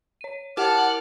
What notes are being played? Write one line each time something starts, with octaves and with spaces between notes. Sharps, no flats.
C#5 D#7
E4 G4 A#4 F#5 A5 D6 F6